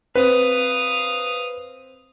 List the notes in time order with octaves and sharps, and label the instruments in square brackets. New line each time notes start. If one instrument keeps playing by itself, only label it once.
[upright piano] C4 [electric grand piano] B4 [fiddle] F5 D#6